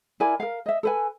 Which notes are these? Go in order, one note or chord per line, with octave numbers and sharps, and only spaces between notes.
E4 A#4 D5 G#5
A#4 F5
D#5 E5
A4 B4 G#5